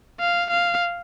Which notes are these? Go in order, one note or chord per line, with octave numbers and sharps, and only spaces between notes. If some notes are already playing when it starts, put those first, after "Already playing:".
F5
F5